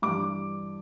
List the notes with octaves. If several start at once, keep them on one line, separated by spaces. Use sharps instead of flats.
G2 E3 D6